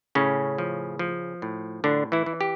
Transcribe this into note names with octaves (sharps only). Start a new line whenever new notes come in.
A2 C#3 C#4
F3
F3
A2
A2 D3 D4
E3 E4
E3
G4